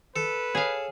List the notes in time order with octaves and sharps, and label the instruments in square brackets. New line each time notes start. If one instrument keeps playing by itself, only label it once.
[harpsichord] A4 [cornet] B4
[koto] G#4 F5 [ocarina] C#5